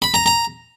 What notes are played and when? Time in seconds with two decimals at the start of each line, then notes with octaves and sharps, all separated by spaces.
0.02 B5
0.14 A#5
0.26 A#5